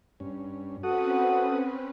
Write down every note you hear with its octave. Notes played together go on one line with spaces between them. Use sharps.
G2 C#4
C4 C#4 F#4 A4 B4 F#5 D#6